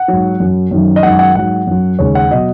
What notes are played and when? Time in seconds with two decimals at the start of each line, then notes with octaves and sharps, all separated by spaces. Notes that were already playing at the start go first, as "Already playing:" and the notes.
Already playing: F#5
0.08 G#2 F#3
0.40 F#2 F#3
0.71 F#2 D#3 F#3
0.96 D#5
1.03 F#2 D#3 G#3 F#5
1.19 F#5
1.35 G#2 F#3 F#5
1.67 F#2 F#3
1.99 D#2 C#3 G#3 C#5
2.15 F#5
2.30 B2 F#3 D#5